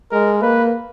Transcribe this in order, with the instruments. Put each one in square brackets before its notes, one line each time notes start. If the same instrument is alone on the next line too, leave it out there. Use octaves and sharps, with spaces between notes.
[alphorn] G#3 [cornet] A#4
[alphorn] A#3 [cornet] B4